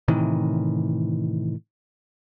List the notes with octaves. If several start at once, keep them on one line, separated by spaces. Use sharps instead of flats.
A2 C3 D#3 E3